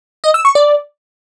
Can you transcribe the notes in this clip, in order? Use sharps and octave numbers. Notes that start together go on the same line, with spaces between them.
D#5
E6
C#6
D5